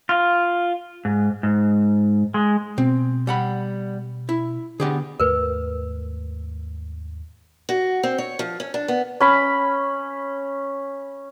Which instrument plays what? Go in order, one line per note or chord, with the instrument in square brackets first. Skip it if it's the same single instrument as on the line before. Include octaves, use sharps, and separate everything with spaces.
[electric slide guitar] F4
G#2
G#2
G#3
[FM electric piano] B2 [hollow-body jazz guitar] C4
[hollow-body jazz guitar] G3 F#5 B5
E4
[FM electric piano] D3 [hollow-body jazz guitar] B3 G4 G#4
[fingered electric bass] D#2 G#2 A3 [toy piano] A#4 B4
[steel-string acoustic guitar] F#4
C4
C#5
F3
C#4
D4
B3
[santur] C#4 B5